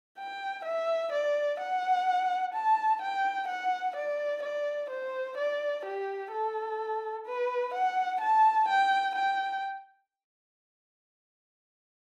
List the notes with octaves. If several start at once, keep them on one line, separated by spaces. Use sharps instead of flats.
G5
E5
D5
F#5
A5
G5
F#5
D5
D5
C5
D5
G4
A4
B4
F#5
A5
G5
G5